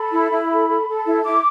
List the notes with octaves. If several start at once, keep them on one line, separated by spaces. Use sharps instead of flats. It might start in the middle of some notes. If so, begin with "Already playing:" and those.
Already playing: A4 B5
E4
E4
A4
A4
A4
E4
E4 D6